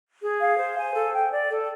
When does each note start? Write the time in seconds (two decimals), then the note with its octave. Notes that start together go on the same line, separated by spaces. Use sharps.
0.21 G#4
0.39 F5
0.58 C5
0.76 G#5
0.95 A4
1.13 G5
1.32 D5
1.50 A4